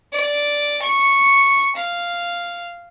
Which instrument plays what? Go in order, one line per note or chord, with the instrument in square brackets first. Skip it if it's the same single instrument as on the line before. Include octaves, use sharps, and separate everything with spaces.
[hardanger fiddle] D5
C#6
F5